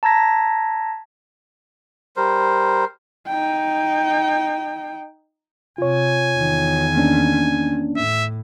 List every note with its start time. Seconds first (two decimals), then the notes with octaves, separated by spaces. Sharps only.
0.03 A5 A#5 E6 G#6 A#6 B6
2.17 G3 A#4 C5
3.28 D#4 G5
5.78 C3 F4 C#5 G#5
6.37 E2 D#3
6.96 A#3 C#4 D4
7.96 A2 E5